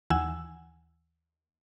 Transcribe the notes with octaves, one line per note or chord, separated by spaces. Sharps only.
D#2 E3 F#5 G#5 E6